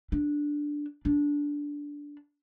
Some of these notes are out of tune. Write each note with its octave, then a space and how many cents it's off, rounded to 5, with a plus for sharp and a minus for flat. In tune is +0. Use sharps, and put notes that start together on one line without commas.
D4 +0
D4 -15